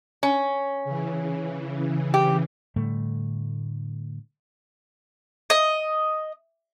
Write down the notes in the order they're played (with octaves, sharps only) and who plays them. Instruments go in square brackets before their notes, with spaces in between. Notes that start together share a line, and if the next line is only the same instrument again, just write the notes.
[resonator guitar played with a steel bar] C#4
[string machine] C#3 E3
[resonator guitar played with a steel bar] G4
[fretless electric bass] A2 D3 G3 A3
[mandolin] D#5